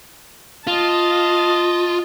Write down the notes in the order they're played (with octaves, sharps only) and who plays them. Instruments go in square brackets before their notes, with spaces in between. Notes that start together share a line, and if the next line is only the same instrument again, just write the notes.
[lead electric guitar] F4 [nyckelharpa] D#5 A5